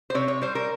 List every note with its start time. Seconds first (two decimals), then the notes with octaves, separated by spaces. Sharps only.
0.10 C5
0.14 C3 C#5
0.28 C#5
0.42 G3 C5
0.55 A#4